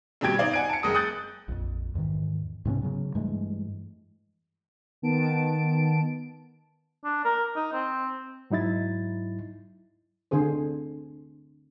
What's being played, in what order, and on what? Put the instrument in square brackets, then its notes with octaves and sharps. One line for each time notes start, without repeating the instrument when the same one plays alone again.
[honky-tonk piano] G2 B2 G3 G4 G#6 D7
D#4 C5 D5 F5
F#5 G#5 D7
A5 C#7
F#1 G#3 D#6
D#6 F#6 G6 A6
[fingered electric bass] A#1 F2
E2 G#2 D#3 E3
G#2 C3 B3 C#4
C#3 F#3
G2 E3 G#3 A3
[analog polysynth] D#3 B3 A5 D7
[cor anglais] D4
A#4
D#4
C4
[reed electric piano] G#2 F#3 D#4 E4 A6
[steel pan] D3 C4 G#4 C5